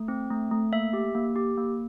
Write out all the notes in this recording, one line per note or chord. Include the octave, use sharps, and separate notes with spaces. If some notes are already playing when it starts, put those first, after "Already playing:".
Already playing: A3
C4
A3
A3
A#3 E5
G4
A#3
G4
A#3